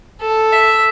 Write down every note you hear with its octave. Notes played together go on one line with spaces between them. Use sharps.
A4
E5